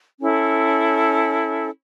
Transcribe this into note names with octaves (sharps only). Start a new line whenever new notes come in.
C#4 E4 A4